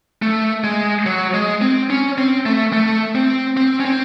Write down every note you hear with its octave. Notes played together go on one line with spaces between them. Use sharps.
A3
G#3
F#3
G#3
C4
C#4
C4
A3
A3
C4
C4
C#4
C4